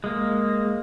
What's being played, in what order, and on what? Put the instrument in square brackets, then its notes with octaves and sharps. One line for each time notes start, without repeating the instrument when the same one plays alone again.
[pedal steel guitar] G#3 A#3